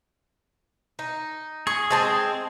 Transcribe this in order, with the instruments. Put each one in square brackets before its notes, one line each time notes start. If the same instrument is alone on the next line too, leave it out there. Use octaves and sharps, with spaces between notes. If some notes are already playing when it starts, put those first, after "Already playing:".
[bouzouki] D#4
[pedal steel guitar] G#4 [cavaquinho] C#6
[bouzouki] G#3 C4 [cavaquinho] D#5 A5 C6